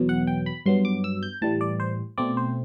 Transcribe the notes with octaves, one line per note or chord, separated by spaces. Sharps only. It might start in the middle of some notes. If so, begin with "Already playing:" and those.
Already playing: E2 B2 F#3 B3
F#5
G5
B5
G2 F#3 B3 C6
D6
E6
G6
A2 E3 G3 A5
D5
C5
B2 A3 C4 D5
C5